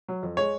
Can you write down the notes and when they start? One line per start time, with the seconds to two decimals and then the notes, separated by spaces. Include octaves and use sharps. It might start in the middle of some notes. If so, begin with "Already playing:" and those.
0.08 F#3
0.23 F2
0.37 G#3 C#5